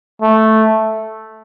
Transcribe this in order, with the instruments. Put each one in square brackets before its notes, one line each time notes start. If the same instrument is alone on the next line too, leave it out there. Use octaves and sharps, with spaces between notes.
[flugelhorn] A3